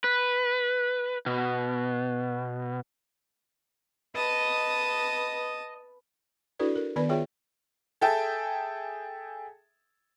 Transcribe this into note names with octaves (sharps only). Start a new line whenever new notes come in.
B4
B2
B4 D#5 A5 D#6
D4 E4 F#4 A4 B4 D5
A#4
D#3 B3 B4 D5 B5
F4 G#4 C#5 E5 G5
G#4 A4 E5 G5 A5